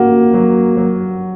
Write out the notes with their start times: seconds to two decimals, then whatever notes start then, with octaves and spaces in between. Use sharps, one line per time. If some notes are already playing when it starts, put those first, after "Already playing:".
Already playing: A#3 F#4
0.34 F#3
0.77 F#3